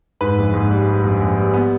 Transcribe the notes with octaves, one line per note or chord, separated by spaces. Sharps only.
G#2 B4
A#1
G#2
G3
G3
A#1
A#1
G3
B3